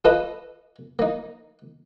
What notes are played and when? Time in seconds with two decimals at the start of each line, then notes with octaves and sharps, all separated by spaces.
0.05 F4 A4 B4 D#5 D#6
0.99 A#3 D#4